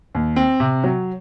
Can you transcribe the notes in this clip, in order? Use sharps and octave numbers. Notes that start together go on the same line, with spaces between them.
D#2
C4
C3
F#3